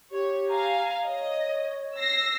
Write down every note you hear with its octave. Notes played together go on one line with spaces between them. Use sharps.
G4 C#5
F5 G#5 A#5
C#5 D#5
E6 A#6 C7